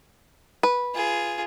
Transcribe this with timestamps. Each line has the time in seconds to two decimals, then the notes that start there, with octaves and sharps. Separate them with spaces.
0.63 B4
0.94 F4 G#4